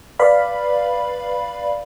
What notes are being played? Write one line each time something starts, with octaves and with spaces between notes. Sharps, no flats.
B4 D5 F5 B5